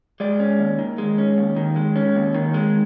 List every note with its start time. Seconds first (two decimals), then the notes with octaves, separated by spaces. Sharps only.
0.20 G#3 D5
0.40 C#4
0.59 D#2
0.79 D#3
0.98 G#3
1.18 C#4
1.38 D#2
1.56 D#3
1.76 G#3
1.96 C#4
2.15 D#2
2.35 D#3
2.54 G#3